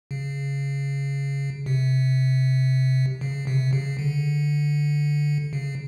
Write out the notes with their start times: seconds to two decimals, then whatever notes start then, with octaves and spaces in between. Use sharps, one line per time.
0.11 C#3
1.66 C3
3.21 C#3
3.47 C3
3.73 C#3
3.99 D3
5.53 C#3